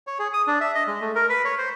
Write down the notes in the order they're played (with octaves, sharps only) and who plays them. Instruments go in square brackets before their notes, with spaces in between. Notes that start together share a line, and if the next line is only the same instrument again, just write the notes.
[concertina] C#5
G#4
D#6
D4
E5
D#5
G#3
A3
A#4
B4
C#5
C5